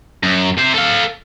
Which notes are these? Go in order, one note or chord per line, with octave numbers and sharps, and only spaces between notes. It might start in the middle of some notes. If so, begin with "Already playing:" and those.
F#2
C3 C5
A4 F5